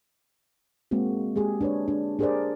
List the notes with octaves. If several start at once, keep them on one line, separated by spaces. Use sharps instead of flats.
G#3 A#3 C4 F#4
G#3 G4 G#4
D4 B4 C#5
D4
D4 G4 G#4 A#4 C5 D5